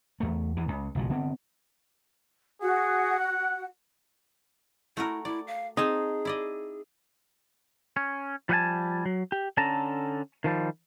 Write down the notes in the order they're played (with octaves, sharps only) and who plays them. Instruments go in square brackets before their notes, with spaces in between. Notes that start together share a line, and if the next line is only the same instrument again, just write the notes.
[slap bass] E2 A3
E2 E3
C#2
F#1 B1 F3 G#3
D3 B3 C4
[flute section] F#4 F#5 [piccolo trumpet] G#4
[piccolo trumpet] F#6
[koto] A3 F#4 A#4 [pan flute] E4
[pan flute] E4 [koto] D5
[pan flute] F5
[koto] C4 G#5 A5 [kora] D#4 [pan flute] G#4
[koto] E4 D5 D#5
[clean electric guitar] C#4
F3 G3 B4 F#5 G#5 A5
F#3
G4
D3 C#4 A4 A5 A#5
D#3 F3 G3